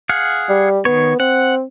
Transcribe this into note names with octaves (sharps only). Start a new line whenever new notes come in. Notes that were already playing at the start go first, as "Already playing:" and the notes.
G#4 F5 F#5
G3
D#3 B3 C#5
C4 F#5